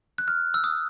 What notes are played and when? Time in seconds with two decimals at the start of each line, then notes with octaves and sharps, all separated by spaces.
0.18 F#6
0.28 F6
0.54 E6
0.64 D#6